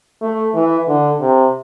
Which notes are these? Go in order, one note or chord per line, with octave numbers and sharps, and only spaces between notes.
A3
E3
D3
C3